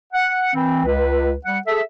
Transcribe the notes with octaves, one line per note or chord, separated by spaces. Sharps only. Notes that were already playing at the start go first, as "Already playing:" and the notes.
F#5
E3 C4
C#2 B4
G3 F#5
G#4 A4 E5